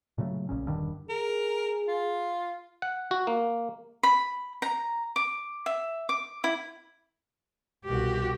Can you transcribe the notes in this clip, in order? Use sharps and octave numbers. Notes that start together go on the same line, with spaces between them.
A#2 C#3 F#3 A3
A#1 A#2 C#3 C#4
E1 G2 D3 D#3
G#4 A#4
F4
F#5
F#4
A#3
B5
A#5
D6
E5
D6
E4
C2 B2 F#4 G4